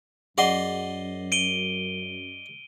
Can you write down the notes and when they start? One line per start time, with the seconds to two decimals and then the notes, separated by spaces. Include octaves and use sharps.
0.38 F#2 G#4 D5 D#5 F#5 C6
1.32 D7 D#7 G7